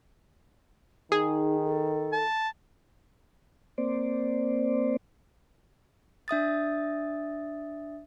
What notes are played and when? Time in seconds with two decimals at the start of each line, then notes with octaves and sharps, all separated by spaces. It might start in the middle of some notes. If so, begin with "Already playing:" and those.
1.12 D#3 D#4 G#4
1.64 A4
2.13 A5
3.78 A#3 C4 C5 D5
6.28 D4 E5 D#6 A6